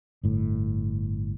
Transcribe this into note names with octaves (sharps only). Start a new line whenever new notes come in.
G1 A2